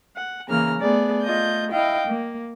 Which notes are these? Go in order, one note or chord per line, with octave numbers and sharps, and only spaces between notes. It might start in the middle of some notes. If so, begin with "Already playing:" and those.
F#5
C#3 E3 A#3 A#5 F6
A3 B3 G#4 D5
A3 F4 D#5 G6
E4 D#5 F5 G5
A#3